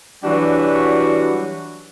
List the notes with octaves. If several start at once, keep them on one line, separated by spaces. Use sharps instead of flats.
E3 F#3 G3 D4 F#4